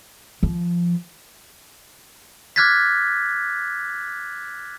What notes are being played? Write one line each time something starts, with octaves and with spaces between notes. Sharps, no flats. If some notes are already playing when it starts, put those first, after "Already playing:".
F3
D6 F6 F#6 G#6 A6 B6